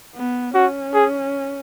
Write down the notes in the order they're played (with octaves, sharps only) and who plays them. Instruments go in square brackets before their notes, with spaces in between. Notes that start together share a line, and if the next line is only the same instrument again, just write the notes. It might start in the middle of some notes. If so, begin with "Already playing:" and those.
[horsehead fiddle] B3
[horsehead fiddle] C#4 [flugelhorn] F#4
[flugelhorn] G#4